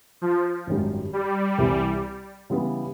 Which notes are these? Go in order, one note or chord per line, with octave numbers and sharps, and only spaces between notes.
F3
G#1 F#2 D#3 G3
G3
C2 C3 E3
C#3 E3 G3 B3